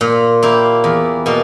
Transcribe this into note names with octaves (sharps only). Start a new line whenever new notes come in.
A#2
A#3 E4 G4
E2
B2 A#3